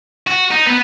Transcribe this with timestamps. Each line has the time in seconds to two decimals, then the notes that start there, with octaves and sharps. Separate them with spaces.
0.27 F#4
0.51 D#4
0.67 B3